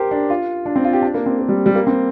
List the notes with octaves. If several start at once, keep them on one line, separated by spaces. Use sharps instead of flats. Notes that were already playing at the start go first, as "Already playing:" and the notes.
Already playing: G4 A#4 C5
D4
F4
D4
C4
F4
G4
D4
A#3
C4
A#3
G3
G3
A#3
C4